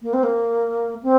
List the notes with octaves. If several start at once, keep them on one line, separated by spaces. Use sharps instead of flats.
A#3
C4
A#3
C4